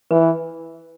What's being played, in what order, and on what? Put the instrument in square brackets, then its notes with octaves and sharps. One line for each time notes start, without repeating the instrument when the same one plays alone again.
[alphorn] E3 [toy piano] B4